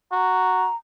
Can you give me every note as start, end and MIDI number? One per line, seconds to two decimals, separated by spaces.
0.12 0.68 66
0.12 0.76 82